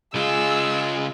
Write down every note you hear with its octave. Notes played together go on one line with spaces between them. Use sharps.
C#3 G#3 F4 G#4 E6